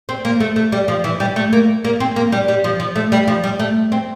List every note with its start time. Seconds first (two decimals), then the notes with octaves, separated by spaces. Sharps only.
0.09 C4
0.25 A#3
0.40 A3
0.56 A3
0.72 G3
0.88 F3
1.04 E3
1.20 G3
1.36 A3
1.53 A#3
1.85 A#3
2.00 C4
2.16 A#3
2.32 G3
2.48 G3
2.64 F3
2.80 F3
2.96 A3
3.12 G3
3.27 F3
3.44 G3
3.59 A3
3.92 C4